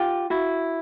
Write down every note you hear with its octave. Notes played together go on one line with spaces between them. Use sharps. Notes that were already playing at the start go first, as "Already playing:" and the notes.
Already playing: F4 G4
E4 F#4